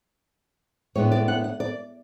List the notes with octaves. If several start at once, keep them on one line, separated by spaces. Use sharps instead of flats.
A2 G#3 B3 D4 C#5
D5
F#5
F#5
D5